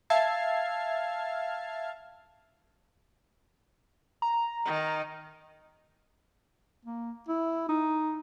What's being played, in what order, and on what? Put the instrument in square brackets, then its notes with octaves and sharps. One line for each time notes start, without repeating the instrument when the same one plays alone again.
[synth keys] E5 F5 A5 F6 G#6 C7
[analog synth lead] A#5
[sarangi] D#3
[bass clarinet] A#3
E4
D#4